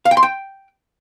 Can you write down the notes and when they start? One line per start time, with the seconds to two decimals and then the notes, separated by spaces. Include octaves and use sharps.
0.05 F5
0.11 G5
0.17 C6
0.23 G5